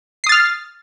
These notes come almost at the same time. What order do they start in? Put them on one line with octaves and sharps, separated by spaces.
C7 D#6 A6 F6